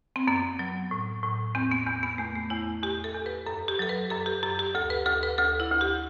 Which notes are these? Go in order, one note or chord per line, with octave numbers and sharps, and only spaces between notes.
C4
F#2 B3
F#3
A2
A2
E2 C4
B3
E2 B3
B3
E2 A3
A3
E2 E4
E2 G4
A4
E2
B4
F#2 A4
G4
F#3 A4
B4
F#2 A4
G4
F#2 G4
G4
D2 A4
B4
D2 A4
B4
D2 A4
E4
D2
G4